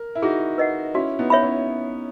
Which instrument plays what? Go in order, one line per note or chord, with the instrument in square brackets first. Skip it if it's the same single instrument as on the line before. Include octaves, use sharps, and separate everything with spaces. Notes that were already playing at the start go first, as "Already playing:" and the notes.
Already playing: [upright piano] A#4
E4
[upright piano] D#4 F#4 [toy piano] G#4
[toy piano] B4 D#5 F#5
[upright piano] C#4 E4 [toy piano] F#4
[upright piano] B3 D#4
[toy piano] C#5 E5 B5
[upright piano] C#4 E4